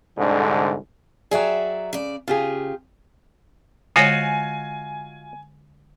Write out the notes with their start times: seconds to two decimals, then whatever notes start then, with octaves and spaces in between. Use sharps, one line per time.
0.18 C2 G#2 D3
1.31 F#3 G#4 D5 E5 G5
1.93 C#3 D5
2.28 C#3 F4 G4 G#4
3.96 D3 G#3 F4 F#4 C#5 D#5 G#5